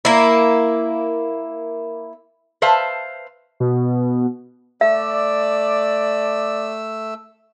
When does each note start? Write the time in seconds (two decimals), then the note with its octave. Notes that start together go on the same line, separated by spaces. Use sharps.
0.05 A#3 E4
2.62 B4 C5 E5 F5 A5
3.60 B2
4.81 A3 D5 E5 E6